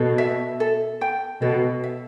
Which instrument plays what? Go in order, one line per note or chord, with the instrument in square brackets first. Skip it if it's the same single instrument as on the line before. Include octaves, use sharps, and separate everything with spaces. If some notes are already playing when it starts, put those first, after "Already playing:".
Already playing: [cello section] B2 [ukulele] A4
[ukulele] E5
A4
G5
[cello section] B2 [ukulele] A4
[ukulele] E5